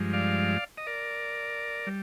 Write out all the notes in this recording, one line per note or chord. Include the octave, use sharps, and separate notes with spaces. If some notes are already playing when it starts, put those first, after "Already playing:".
Already playing: G2 F3 G#3
D5 F5
D#5
A#4 D5
G3